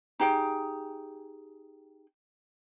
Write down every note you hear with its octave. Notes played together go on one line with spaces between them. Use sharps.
D#4 G4 G#4 G5